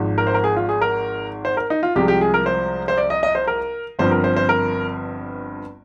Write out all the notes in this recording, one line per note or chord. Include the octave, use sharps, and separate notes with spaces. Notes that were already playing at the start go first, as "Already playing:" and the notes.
Already playing: G#1 G#2 F3
A#4
C5
A#4
G#4
F4
G#4
A#4
C5
A#4
D#4
F4
C2 C3 F3 G#3 G4
G4
G#4
A#4
C5
C5
D5
D#5
D#5
C5
A#4
G1 G2 F3 C4 C5
A#4
C5
C5
A#4